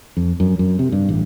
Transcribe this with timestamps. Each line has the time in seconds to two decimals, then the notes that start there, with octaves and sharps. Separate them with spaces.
0.17 F2
0.40 F#2
0.59 F#2
0.79 C3
0.92 G2
1.09 A1